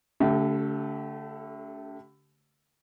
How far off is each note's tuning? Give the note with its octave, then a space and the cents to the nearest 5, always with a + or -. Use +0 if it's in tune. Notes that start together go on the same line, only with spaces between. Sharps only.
D3 -45 A3 +0 G4 -30